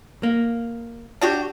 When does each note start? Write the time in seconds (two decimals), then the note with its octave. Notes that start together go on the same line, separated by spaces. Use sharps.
0.23 A#3
1.21 D4 F#4 G4